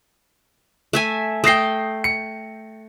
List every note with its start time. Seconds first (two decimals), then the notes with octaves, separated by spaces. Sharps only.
0.93 A3 E5 G#5
1.44 A3 G5 D#6 A#6 C7
2.04 C#7